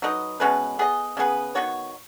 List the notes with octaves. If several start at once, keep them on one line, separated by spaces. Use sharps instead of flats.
F#3 D#4 B4 D#5
B2 G#3 C#4 B4
B3 G#4 D#5
C#3 B3 G#4 B4
D#3 B3 F#4 C#5